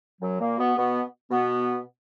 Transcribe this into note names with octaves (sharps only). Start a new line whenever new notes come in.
F#2 F#3
A#2 A#3
B2 B3
B2 B3
B2 B3